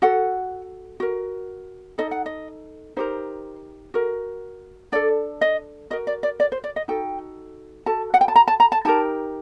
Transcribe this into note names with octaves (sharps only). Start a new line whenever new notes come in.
F#4 A4 F#5
F#4 A#4
D#4 A4 D#5
F#5
D#5
D#4 G4 A#4 C5
F#4 A#4
D4 A4 D5
D#5
F#4 A#4 D#5
D5
D5
D5
C5
D5
D#5
D#4 F#4 A4 G5
F#4 A4 A5
F#5
G5
A5
A#5
A5
A#5
A5
D#4 G4 A#4 A5